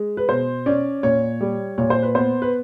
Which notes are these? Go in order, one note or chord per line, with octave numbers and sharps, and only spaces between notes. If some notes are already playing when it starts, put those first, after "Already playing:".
Already playing: G#3
B4
B2 C5
C#4 D5
A#2 C#5
G3
A#2 C#5
C5
B4
B3 C5
B4